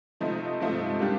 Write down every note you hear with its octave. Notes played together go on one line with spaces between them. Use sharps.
C3 F3 A3 C4 D#4
C3 F3 A3 C4 D#4
G3 A#3 D4 G4